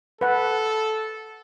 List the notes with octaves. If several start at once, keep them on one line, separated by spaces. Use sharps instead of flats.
A4 B4 F#5